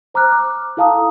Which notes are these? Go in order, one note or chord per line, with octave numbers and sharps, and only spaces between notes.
C5 A#5 D6 F6 F#6
D6
E4 A4 F5 A5 A#5 D#6